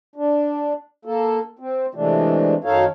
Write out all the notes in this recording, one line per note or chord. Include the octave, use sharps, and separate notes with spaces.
D4
A#3 A4
C4
C3 E3 G#3 A3 D4
F#2 D#3 D#4 A4 C#5 F5